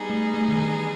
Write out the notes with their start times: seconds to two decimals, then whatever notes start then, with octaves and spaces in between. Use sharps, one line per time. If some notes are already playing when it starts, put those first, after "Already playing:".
Already playing: G3 B3 D#4 G#4
0.10 A3
0.34 A3
0.48 D#3
0.58 E3